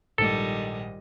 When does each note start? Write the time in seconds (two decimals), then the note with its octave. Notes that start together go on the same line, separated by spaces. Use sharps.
0.18 A#1 G#2 D#3 G3 A4 D#5